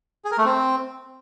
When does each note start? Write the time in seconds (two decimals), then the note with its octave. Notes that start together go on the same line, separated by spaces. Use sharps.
0.25 G#4
0.31 A#4
0.38 A3
0.45 C4